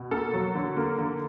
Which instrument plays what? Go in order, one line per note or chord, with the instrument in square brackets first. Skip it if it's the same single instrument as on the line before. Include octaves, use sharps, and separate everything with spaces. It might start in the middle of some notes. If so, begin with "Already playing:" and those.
Already playing: [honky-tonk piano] B2
A#3 A4
F#3
D3
A#3
D3